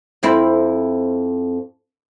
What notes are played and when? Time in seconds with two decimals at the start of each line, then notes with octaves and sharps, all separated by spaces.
0.23 F2 C4 E4